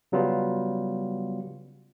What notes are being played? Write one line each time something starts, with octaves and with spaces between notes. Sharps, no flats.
C#3 F#3 G3 B3 F4